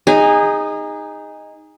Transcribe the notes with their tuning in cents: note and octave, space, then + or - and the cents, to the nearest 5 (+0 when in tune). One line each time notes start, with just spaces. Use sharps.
D#4 +0 G#4 -25